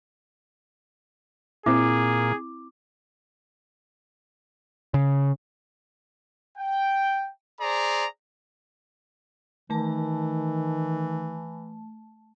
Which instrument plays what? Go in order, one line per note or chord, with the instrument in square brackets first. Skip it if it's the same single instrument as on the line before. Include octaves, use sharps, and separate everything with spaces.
[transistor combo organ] A#2 [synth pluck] C4 E4 [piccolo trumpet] G#4 [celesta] D6
[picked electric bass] C#3
[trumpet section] G5
G#4 C5 D5 A#5
[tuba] D#3 [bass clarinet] E3 [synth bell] A3 A5